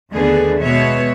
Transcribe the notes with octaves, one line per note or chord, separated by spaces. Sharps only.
D#2 D3 A3 B3 D4 G#4
B2 G#3 B3 C#5 E5